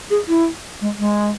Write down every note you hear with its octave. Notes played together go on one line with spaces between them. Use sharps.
G#4
E4
G#3
G#3